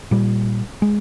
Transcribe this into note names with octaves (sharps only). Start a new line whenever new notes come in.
A#2 G3
G#3